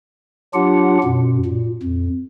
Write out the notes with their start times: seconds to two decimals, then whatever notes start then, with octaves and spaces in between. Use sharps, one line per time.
0.54 F#3 D4 F4 G4 F#5
1.04 F#2 B2
1.46 A#2
1.83 F2